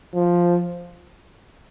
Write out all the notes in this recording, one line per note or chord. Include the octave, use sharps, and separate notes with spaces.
F3